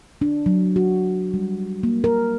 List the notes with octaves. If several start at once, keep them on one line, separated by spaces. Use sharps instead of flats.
D4
F#3
F#4
G3
A#3
A#4